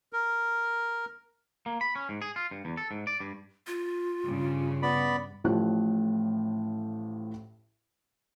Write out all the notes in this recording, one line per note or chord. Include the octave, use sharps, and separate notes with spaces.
A#4
A#3
B5
C#4
G#2
G#4
F4
G2
E2
A4
G#2
D5
G2
F4
G2 C#3
B3 D5 B5
A1 A2 F3 F#6